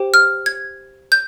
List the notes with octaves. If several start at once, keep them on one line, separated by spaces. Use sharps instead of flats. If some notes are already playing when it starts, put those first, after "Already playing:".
Already playing: G4 C5 G5
F6
G#6
G6